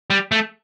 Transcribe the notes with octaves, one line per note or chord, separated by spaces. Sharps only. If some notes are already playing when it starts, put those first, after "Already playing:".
G3
A3